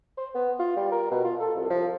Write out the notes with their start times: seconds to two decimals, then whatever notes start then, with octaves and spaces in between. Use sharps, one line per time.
0.18 C5
0.35 B3
0.59 F4
0.76 G3
0.92 A#4
1.11 B2
1.24 F4
1.40 A4
1.56 C2
1.70 F3